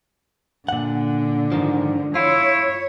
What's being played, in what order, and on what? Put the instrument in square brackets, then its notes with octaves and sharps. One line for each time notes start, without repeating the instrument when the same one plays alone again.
[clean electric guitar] A#2 F#5 [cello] D3
[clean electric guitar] G#2 D#3 F3
[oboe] E4 [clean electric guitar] F4 [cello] C#5